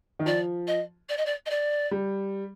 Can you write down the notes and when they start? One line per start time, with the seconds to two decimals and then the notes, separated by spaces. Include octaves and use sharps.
0.19 D#3
0.25 F3 D5
0.67 D#5
1.09 D5
1.17 D#5
1.25 D5
1.46 D#5
1.50 D5
1.91 G3